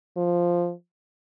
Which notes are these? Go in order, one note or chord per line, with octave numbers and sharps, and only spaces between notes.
F3